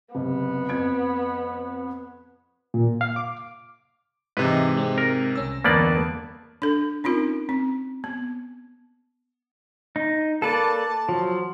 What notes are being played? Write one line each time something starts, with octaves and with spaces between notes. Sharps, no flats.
F#1 C3 B3
F2 G#6 D7
A#2
F5
D6
G#2 C3 E3 G#3 E4 B4 D#5
G#3 C4
A#4
C2 C#4 E6 A#6
G1 E2 A#3 B3 D5 A5 B5
D4 A4
C4 C#4 D#4 F4 A#4
C4
B3
D#4
A#3 A4 B4 D5 A5
F3 F#3